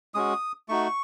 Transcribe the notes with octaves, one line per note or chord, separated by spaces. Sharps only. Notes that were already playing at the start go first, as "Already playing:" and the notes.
G#3 C#4 F#4 D#6
A3 D#4 F#4 C#6